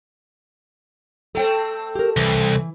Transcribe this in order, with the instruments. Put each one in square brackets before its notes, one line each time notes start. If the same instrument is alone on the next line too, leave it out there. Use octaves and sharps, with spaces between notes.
[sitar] A3 C4 [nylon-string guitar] A4 G5
[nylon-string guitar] G4 A#4
[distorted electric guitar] C2 [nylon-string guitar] E3